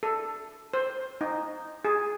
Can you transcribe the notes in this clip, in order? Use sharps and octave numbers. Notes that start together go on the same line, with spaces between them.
A4
C5
D#4
G#4